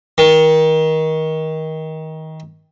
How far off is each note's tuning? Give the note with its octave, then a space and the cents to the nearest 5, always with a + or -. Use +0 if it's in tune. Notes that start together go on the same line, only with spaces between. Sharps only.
D#3 +25